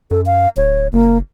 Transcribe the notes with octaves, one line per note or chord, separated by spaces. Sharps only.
F#2 A4
F5
D1 C#5
F#1 A#3